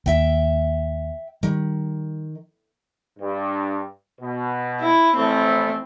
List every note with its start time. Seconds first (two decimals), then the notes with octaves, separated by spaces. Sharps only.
0.06 D#2 E5 G5
1.43 D#3 G3
3.18 G2
4.20 B2
4.81 E4
5.16 A1 F3 A3 C4